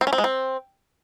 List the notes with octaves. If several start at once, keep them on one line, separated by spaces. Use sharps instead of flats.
C4
C#4
C4
G#3
C4